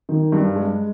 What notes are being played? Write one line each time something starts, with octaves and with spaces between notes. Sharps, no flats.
D#3
G2
G#3